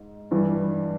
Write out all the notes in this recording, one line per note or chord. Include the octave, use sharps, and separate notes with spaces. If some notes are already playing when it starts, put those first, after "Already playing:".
Already playing: G#2
G2 E3 G3